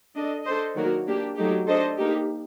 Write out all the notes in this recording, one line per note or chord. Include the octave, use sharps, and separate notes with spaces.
D4 A4 D#5
D4 A4 C5 D#5
D#3 F#3 A#3 F#4 A#4
A#3 D4 G4
F#3 A3 D#4 G4
D4 A4 C5 D#5
A#3 D#4 G4